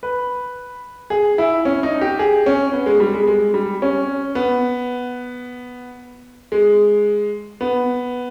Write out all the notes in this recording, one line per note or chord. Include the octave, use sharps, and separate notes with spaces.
B4
G#4
E4
C#4
D#4
G4
G#4
C#4
B3
G#3
G3
G#3
G#3
G3
C#4
B3
G#3
B3